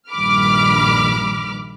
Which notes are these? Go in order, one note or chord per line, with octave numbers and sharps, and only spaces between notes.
A#1 G2 D#3 B5 D6 F6